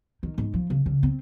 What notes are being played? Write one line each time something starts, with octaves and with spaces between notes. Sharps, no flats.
D#3
G#2
F3
C#3
C#3
C4